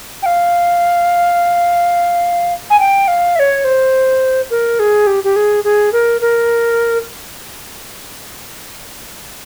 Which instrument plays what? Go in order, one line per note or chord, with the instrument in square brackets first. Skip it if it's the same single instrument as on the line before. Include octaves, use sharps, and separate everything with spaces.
[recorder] G5
F5
G#5
G5
F5
E5
C#5
C5
A#4
G#4
G4
G4
G#4
G#4
A#4
A#4